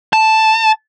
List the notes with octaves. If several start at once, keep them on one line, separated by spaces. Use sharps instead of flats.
A5